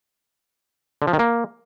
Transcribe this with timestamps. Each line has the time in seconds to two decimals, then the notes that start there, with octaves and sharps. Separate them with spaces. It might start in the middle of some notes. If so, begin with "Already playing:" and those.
1.02 D3
1.08 F3
1.13 D#3
1.19 A#3